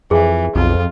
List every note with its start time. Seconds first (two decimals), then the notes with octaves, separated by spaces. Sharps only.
0.11 F2 E3 G#4
0.55 B1 F2 F4